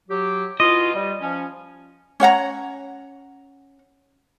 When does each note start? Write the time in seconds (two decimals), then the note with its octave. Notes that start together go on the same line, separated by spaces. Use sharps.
0.09 F#3 G4
0.60 B2 E4 F4 D#5
0.93 G3
1.20 F3 C#4
2.20 C#4 C#5 F#5 A#5